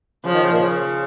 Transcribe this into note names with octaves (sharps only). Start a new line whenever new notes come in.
C#3 F3
D#3
C#3
A#2
C#3